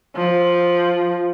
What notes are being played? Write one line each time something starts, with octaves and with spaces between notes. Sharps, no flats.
F3